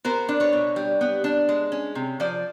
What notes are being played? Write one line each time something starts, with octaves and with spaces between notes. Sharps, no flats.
B3 A#4 C5
D4
B4 C#5
B2
G3
B3
D4
G#3
C#4
C3
F3 C5 D5